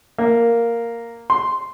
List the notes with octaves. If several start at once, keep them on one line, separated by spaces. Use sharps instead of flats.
A#3
C6